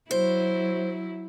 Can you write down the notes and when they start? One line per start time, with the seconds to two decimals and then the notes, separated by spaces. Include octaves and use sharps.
0.11 F#3 E4 C5